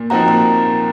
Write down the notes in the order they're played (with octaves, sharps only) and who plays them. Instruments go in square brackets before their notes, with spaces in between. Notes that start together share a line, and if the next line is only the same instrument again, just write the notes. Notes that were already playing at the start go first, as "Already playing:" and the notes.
Already playing: [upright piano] A#2
[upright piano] F3 C4 D#4 F#4 [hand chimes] A#5
[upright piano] A#2 [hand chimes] A#5